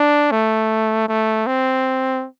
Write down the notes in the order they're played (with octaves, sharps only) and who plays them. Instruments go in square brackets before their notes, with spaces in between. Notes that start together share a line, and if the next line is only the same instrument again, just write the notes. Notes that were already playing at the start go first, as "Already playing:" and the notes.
Already playing: [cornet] D4
A3
A3
C4